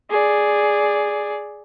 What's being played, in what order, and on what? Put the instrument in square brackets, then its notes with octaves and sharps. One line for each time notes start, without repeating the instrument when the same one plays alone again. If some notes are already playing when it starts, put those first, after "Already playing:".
[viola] G#4 D5